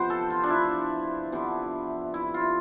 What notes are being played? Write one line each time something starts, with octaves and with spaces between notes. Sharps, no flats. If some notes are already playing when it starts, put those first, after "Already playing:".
Already playing: C3 F3 B3 C5
A4
F4
D4
E4
C3 F3 B3 D4
E4
F4